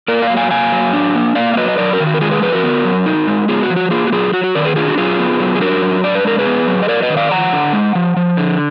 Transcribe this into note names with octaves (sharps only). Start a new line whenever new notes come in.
A#3 A#4 D5
D5 F5
F#3
F5 G#5
A#3 F5 G#5
F#3
D4
A#3
A#3 D5 F5
F5
F#3 B4 D#5
D#5
F#3 A#4 D5
F#4 A#4
D#3
F#4
A#4
G#3 F4 G#4
G#4 B4
F3 G#4 B4
F#4 A#4
B3
F#3
D#4
G#3
B3 F4 G#4
F#4
F3
F#4
A#3 F4 G#4
F#4
F#3 F4 G#4
F#3 F#4
F#4
D#3 A#4 D5
G#4 B4
D4 F4 G#4
F#4
F#3 F4 G#4
B3
F#3
G#4
D4 F#4 A#4
F#3
D4 D5
B4
G#3 A#4
G#4 B4
B3
F#3
D#5
F#3 A#4 D5
B4 D#5
D#3
D5 F5
F3 F#5 A#5
D3
G#3
F3
F3
D3